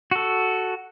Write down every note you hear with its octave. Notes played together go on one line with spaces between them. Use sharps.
F#4 A4